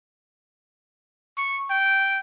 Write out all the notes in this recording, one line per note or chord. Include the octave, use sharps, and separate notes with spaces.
C#6
G5